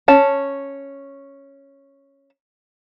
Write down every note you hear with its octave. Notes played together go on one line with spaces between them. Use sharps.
C#4 A5